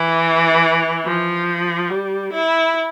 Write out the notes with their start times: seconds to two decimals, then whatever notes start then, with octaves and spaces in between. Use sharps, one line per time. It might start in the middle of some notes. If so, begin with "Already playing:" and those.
Already playing: E3
1.05 F3
1.90 G3
2.33 E4